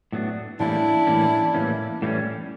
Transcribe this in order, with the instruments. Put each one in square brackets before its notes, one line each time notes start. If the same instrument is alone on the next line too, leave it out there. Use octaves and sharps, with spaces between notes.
[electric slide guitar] A2 F#3 B3 D4
[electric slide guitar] A2 E3 G3 A#3 C#4 [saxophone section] D4 E4
[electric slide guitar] A2 E3 G3 A#3 C#4
A2 E3 G3 A#3 C#4
A2 E3 G3 A#3 C#4